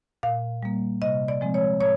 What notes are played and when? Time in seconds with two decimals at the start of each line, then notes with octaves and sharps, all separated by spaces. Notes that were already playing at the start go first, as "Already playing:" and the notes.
0.23 A#2 F5
0.63 G3 A#3
1.02 C3 D#5
1.28 D5
1.41 F3 G#3 C4
1.54 C#5
1.80 A2 C#5